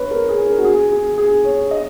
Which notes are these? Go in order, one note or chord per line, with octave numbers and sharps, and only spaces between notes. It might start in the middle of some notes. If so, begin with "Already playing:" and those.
Already playing: B4 C#5
A#4
G#4
A#4
F#4
G#4
G#4
G#4
C#5
D#5